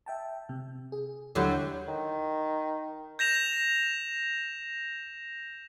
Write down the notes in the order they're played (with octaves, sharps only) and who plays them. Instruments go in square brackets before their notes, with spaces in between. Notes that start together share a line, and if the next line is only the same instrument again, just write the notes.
[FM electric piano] E5 G5 A5
C3
G#4
[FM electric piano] D#2 E4 G6 [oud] D3 F#3 G3
[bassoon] D#3
[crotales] G6 A#6 E7 F7